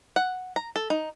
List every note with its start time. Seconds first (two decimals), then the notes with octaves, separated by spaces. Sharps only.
0.16 F#5
0.56 A#5
0.76 A4
0.90 D#4